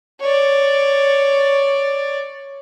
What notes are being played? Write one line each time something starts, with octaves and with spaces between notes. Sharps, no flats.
C#5 D5